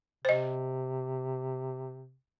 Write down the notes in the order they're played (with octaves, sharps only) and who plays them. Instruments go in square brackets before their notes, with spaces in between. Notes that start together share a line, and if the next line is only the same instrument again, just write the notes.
[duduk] C3 [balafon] C5 D#5